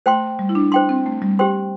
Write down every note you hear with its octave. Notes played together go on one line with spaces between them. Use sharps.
A3 C5 G5 C6
G3
E4
D4
D4 C5 G5 C6
C4
A3
G3
G4 C5 G5 C6